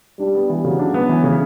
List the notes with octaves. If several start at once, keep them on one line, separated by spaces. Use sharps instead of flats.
G3 D4
B3
E3
C#3 F#3
D4
B3
E3
C#3